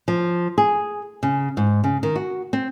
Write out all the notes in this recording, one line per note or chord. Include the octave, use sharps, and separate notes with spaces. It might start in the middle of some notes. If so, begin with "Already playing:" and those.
F3
G#4
C#3
G#2
C#3
D#3
F#4
C4